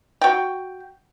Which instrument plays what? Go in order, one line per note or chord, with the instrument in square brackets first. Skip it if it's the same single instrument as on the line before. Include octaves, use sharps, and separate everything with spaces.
[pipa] F#4 G5